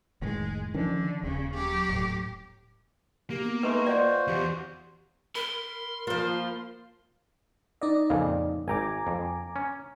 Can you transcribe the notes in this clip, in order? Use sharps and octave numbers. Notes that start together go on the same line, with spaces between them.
F1 A2 D#3 G#3
D3 D#3 F3 C#4
D#1 C#3
F#3 G4
D#1 A2
A#3 G4
B3
G#3 A3 D#4 B4
F4 F#4 C5 D5 D#5
E2 G4
A#4 B5 C6
F3 A#3 F4 F5
D#4 D5 D#5
F2 A#2 C#3
G#1 G5 G#5 A#5 D6
F2
C#4